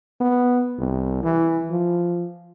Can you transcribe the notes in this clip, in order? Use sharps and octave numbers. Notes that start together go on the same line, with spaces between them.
B3
C2
E3
F3